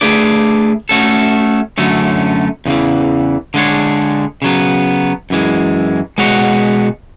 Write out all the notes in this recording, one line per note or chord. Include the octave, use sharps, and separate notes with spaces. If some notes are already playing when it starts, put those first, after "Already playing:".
A3 D4 G#4 B4 D5
A3 C#4 F#4 A4
F#2 D3 F#3 A3 C#4
E2 C#3 E3
D3 G#3 D4 G#4 C#5
C#3 F#3 B3
F#2 E3 G#3
B2 G#3 B3 F#4 C#5